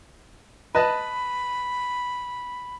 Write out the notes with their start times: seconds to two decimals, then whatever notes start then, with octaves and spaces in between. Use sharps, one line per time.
0.75 B4 D#5 A5 B5